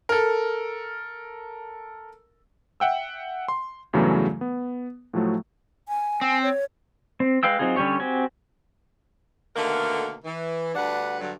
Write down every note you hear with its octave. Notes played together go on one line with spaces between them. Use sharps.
A4 A#4
E5 F#5 G5 E6
C6
E2 G2 C#3 E3 F#3 A3
B3
A2 F3 F#3 A3
G#5
C4
C#5
C4
G#3 B4 F5 G5 E6
F#3 C4 D#4 F4 G#4
D3 G3 C#4 G4 C#5
C4 F#4 G4 G#5
B2 D3 D#3 A3 A#3 A#4
E3
D2 G2 D4 B4 F#5
G2 D3 F#3